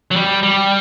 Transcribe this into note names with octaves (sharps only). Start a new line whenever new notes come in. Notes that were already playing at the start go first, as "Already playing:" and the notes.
F#3
G3
G3